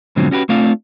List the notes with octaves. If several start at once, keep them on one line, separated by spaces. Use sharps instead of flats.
G#2 B2 D3 F3 F#3 C4
C#4 F#4 G4 B4
A3 C4 D4 F4 F5